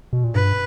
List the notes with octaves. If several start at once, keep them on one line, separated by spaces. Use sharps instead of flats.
B2
A#2
G2 B4